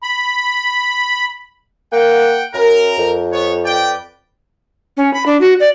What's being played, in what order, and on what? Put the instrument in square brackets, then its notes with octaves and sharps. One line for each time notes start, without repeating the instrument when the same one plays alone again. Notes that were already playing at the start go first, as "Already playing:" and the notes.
[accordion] B5
[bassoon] A#3 [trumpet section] F#5 G5
[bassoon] F#2 [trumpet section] A#4
[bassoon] F2
[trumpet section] B3 C#5
B4 D5 G5
[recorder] C#4
B5
D4
F#4
D5